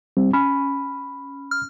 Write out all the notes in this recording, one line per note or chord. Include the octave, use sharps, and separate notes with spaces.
G3 C4
C#4 B5
F6